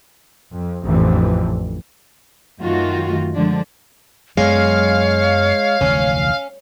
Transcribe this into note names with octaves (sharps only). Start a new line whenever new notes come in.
F2
A1 F2 D3 E3
F#2 D#3 A3 F4 F#4
D3 F3 G#3 D4
F#2 F#3 G#3 B3 C#5 F5
F1 D2 E3 C#4